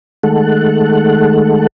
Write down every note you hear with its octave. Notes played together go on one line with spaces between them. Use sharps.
D#3 G#3 A3 A4 F#5